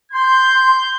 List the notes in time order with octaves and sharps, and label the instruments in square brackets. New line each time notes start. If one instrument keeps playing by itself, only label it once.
[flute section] C6 [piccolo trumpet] G6